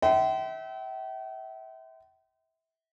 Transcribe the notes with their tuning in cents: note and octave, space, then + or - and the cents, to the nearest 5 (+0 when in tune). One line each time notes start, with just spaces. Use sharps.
E5 -25 G5 -40 C6 -30